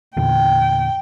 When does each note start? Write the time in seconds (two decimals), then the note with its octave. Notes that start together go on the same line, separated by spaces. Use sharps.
0.17 E2 A#2 D3 G5